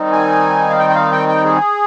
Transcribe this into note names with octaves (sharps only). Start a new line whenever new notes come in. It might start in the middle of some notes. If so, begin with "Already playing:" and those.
Already playing: D#3 G3 C4 D#4
G#5
F5
G5
G5
F5
G5
G5
G#4